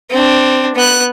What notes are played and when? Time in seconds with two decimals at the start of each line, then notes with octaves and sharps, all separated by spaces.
0.10 C4 D4
0.75 B3 F#6